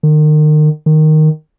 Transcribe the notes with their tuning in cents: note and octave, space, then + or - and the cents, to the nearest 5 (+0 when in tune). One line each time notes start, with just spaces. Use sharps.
D#3 -35
D#3 -5